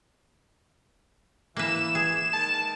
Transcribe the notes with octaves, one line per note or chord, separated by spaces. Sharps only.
E3 A#3 B4 E7
G#4
D#3 G#3 A5